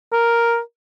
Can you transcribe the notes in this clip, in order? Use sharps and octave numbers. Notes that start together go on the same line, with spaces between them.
A#4